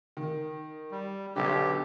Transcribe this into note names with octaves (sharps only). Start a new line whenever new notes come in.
D#3
G3
B1 D3 G4